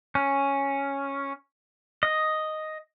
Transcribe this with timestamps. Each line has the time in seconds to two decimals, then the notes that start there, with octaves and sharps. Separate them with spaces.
0.15 C#4
2.03 D#5